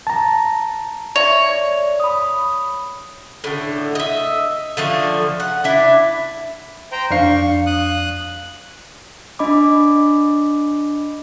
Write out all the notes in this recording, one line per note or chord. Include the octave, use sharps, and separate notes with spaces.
A5 A#5
C#5 D5 E5
B5 D#6
A2 D3
D#5 E5
D3 F3 A3
F#5
D4 E4
C5 G5 A#5
F2 D4 F5 C#6 C7
D#6 F#6
D4 D#5 B5 D6